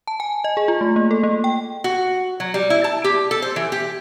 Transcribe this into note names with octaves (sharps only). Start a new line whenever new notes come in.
A5
G#5
D#5
G#4
F4
A3
A#3
A4
A#3
G5
F#4
F#3
G3
E4
A5
G4
A4
C5
E3
G4